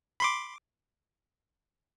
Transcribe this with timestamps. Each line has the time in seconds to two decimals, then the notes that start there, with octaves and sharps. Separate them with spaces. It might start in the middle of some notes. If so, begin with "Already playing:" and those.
0.20 B5 C6 D6